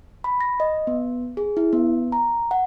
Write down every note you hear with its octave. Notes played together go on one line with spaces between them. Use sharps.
B5
A#6
D#5
B3
G#4
E4
B3
A#5
F#5